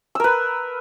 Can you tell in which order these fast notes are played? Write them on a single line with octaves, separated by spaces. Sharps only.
E6 A#4 B4